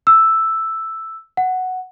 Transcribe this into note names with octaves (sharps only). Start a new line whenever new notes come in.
E6
F#5